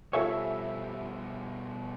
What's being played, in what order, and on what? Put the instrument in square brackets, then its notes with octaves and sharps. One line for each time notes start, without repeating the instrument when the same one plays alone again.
[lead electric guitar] B2 G3 [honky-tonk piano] F4 E5 G#5 [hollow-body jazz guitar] A4 C5 C#5